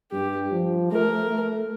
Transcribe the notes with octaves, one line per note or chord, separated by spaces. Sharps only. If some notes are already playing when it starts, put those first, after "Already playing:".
G2 G4
F3
A3 A#4
A3